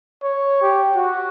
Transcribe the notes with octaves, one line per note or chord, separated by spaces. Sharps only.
C#5
G4
F#4